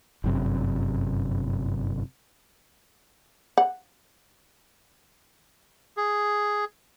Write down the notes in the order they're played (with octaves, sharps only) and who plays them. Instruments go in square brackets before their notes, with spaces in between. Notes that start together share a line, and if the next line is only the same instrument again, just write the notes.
[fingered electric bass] G1 F#2 C3
[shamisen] F#5
[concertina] G#4